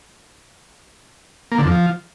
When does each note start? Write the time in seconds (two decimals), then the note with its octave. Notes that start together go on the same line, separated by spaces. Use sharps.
1.52 A#3
1.58 D3
1.65 F2
1.71 F3